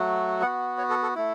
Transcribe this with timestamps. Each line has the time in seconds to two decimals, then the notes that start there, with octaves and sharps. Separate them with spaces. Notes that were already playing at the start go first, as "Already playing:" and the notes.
Already playing: F#3 A3 F#4
0.42 B3 F#5
0.46 F#4
0.78 C#5
0.90 A4
1.03 A4
1.15 A3 E4